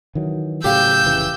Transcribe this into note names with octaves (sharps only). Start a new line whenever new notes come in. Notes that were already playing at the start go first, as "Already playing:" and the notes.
D#3 E3 F#3
A2 C#3 F#3 G4 F5 E6 G6
F1 C#3 E3